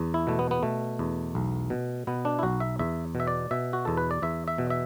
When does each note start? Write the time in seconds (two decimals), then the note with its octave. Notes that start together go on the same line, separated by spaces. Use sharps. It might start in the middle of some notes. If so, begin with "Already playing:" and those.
Already playing: E2
0.14 E4
0.27 B2 A3
0.39 B3
0.51 B3
0.63 B2 A3
0.99 E2
1.35 B1
1.70 B2
2.07 B2 B3
2.25 D4
2.39 E4
2.43 B1 F#4
2.60 E5
2.79 E2 E5
3.15 B2
3.20 E5
3.28 D5
3.51 B2 E5
3.73 F#4
3.85 E2 A4
3.97 B4
4.11 D5
4.22 E2 E5
4.48 E5
4.58 B2
4.70 E5